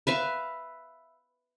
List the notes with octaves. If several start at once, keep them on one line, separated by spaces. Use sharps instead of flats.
B4 E5 F5